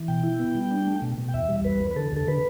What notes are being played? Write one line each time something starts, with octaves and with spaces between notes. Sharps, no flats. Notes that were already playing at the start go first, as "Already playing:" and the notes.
Already playing: E3
B2 G5
E4
B3
G3
D4
A3
B2
B2
G5
E2 E5
G3
E2 B4
E2
B4
D3 A4
D3 A4
D3 B4